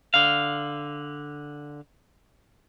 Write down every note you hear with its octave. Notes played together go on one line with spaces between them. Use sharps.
D3 F5